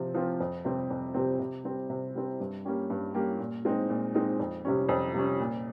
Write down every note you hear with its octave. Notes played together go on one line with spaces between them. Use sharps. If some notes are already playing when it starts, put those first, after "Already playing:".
Already playing: C3 F3 C4
F3 C4 F4
F2
C3 G3 C4
F2
C3 G3 C4
C3
G3 C4
C3
G3 C4
G2
G3 A#3 C#4 G4
G2
G3 A#3 C#4 G4
A#2
G#3 C4 D#4
A#2
G#3 C4 D#4
F2
C3 G3 C#4
F2
C3 G3 C#4
A#2